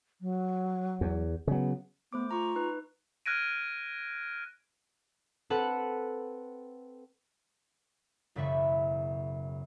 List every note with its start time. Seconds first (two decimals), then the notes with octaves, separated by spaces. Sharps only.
0.21 F#3
1.01 E2
1.47 C#3 F#3 B3
2.13 A3 B3 C5 D6
2.31 F4 A#5 C#6
2.56 D#4 B4
3.26 F6 F#6 G#6 A#6 D7 D#7
5.50 C4 A4 B4 F#5
8.36 E1 F#2 C#3 E5 B5 C#6